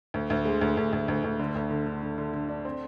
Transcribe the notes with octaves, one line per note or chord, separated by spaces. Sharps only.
D2
D2
G#3
D2
D2
D2
D2
D2
D3
D2
D3
D3
D3
D3
D3
D4
C4